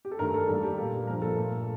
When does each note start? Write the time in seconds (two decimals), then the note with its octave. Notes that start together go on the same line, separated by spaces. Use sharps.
0.05 G4
0.11 A4
0.19 G2 D#3 A3 A#4
0.34 A4
0.48 G2 D#3 G3 A#3 A4
0.63 G4
0.78 A#2 G3 A#3 A4
1.07 G2 F3 A#3 A#4
1.22 A4
1.37 A#2 A3